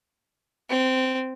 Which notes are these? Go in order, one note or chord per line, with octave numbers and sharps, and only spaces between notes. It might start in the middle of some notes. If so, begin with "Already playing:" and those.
C4